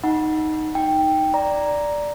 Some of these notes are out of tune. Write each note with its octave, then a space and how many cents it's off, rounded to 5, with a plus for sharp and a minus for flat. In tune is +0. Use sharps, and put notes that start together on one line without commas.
D#4 +0 F#5 +0 B5 -30
D#4 +0 G5 +0
D5 +0 A#5 +0